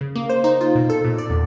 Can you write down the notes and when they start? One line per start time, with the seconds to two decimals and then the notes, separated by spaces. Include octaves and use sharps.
0.01 C#3
0.16 A#3
0.30 C5
0.44 D#4
0.61 F4
0.75 B2
0.90 A4
1.05 A#2
1.18 D5
1.30 E2